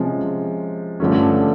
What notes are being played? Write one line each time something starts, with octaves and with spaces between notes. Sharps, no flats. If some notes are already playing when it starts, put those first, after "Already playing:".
Already playing: C3 F3 G#3 C#4 F4
G2 D3 F3 A3 C#4